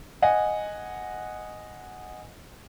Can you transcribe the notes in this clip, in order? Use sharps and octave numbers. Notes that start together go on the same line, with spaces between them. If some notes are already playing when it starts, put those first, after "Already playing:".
D#5 F#5 G#5